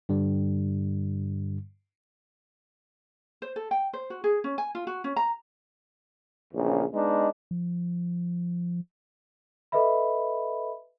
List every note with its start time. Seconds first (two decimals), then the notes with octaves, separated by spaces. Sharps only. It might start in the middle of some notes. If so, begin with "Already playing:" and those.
0.09 G2 D3 G3
3.42 C5
3.56 A4
3.71 G5
3.93 C5
4.10 F#4
4.24 G#4
4.44 C#4
4.58 G#5
4.75 F4
4.87 F#4
5.04 C#4
5.16 A#5
6.54 A#1 E2 C#3
6.93 G#3 B3 D4 D#4
7.51 F3
9.72 A4 B4 D#5 E5 B5